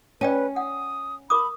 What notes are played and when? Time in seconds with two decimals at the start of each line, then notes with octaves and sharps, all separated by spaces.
0.21 C#4 B4 D5 G5 A5
0.56 F#5 D#6
1.30 A#4 B5 D6 D#6